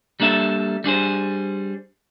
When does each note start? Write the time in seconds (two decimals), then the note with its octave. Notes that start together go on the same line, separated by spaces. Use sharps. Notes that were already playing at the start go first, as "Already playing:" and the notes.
0.20 G3 A#3 D4 A4 E5
0.84 G3 D4 G#4 C5